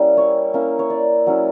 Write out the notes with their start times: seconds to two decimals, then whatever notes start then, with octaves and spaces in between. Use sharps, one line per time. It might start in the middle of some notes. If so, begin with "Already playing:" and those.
Already playing: G3 A#3 C#4 E4
0.17 C#5
0.54 A#3 C#4 E4
0.79 C#5
0.90 D5
1.26 F#3 C#4 E4